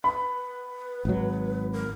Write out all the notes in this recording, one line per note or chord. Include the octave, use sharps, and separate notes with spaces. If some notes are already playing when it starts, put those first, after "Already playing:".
B4 B5
G#1 F#3
A#4